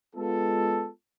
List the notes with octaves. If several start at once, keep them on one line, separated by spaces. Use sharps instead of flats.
G#3 B3 F4 A4